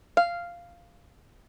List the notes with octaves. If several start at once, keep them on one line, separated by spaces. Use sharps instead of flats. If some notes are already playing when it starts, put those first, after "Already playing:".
F5